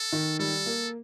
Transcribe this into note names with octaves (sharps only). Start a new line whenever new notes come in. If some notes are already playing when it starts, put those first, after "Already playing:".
Already playing: A4
D#3
G3 A4
A#3